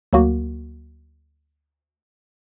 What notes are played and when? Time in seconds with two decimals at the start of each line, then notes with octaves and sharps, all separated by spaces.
0.13 D2 F#3 A#3 F#4